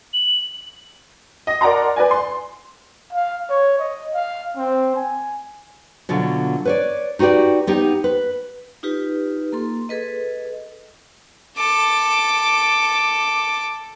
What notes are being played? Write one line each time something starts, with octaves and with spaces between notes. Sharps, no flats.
F#7
D#5
A#4 D5 F#5 A5 A#5 C6
B4 D5 G#5
C6
F5
C#5
D#5
F5
C4
G#5
B2 D3 F#3 F4
B4 C#5 D5
D#4 F#4 G4 B4 D5
B3 D#4 G4
B4
D#4 F4 G4 B4
A#3 A4 C6
G#4 A4 B4 D#5
A4 D6